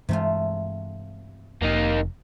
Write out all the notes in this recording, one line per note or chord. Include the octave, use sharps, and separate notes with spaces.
G2 C3 E3 G#3 A3 F4
F1 A#3 D#4